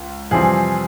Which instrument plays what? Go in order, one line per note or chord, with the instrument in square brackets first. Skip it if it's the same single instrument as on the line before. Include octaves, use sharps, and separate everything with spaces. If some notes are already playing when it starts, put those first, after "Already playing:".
Already playing: [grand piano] C#2
F2 C3 E3 G3 C4 G#4